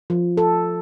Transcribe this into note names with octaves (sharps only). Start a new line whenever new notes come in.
F3
A4